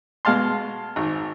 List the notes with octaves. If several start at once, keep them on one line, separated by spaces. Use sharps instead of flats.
B2 G#3 F5 A5 C6
G#1